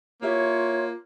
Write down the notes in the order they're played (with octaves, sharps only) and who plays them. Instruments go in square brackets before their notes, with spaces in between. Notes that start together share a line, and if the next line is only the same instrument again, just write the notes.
[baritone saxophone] A#3 [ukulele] E4 G4 E5 [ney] F4 [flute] C#5